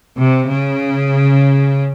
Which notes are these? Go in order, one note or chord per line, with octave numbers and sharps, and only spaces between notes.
C3
C#3